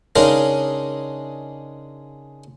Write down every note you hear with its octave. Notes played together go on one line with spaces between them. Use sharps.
C#3 G#3 D4 D#4 A#4